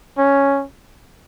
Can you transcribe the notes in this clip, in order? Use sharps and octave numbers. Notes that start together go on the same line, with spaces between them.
C#4